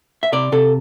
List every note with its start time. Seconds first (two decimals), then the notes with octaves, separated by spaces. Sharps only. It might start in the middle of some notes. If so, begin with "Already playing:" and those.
0.23 E5
0.32 C3 D5
0.52 C3 A4